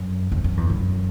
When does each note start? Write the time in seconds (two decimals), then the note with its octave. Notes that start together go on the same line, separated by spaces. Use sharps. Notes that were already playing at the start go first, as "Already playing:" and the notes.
Already playing: F#2
0.32 E2
0.44 F#2
0.57 E2
0.70 F#2